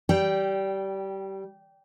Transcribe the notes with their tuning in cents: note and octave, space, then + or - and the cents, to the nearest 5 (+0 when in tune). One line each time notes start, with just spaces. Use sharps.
G3 -20 G5 +0